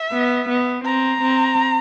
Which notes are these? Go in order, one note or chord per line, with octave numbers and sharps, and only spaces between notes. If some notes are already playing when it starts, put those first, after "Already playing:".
Already playing: E5
B3
B3
C4 A#5
C4